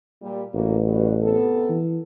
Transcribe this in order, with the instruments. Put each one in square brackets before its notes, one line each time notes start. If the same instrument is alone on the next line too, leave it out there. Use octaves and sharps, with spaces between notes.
[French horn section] A#2 G3
[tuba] A1 [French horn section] E3 A#3 F#4
[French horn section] G2 G3 F#4
C3 B3 A4
[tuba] E3